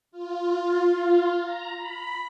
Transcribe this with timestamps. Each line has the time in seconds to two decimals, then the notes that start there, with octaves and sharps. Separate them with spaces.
0.11 F4
1.41 A#5
1.77 B5